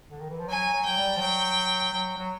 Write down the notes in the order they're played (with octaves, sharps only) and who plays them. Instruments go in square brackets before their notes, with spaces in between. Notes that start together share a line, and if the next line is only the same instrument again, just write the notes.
[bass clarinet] D3
D#3
E3
F3
[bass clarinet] F#3 [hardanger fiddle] G#5
[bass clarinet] F#3
[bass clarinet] F#3 [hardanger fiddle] G5
[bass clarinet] G3
F3
[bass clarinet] F#3 [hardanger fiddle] G5
[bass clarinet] F#3
F#3